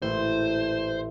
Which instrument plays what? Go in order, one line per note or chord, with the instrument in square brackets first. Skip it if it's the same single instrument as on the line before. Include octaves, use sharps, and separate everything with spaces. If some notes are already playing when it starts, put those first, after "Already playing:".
[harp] A1 A#2 [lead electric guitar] C5